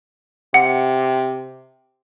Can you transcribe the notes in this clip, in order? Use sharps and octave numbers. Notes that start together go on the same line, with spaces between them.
C3 F#5